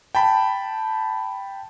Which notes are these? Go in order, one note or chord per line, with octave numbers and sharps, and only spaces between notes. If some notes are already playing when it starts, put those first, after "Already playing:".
G5 A5 B5